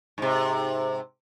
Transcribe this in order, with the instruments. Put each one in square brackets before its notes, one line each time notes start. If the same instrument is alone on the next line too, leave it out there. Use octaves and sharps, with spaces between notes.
[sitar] G#2 C3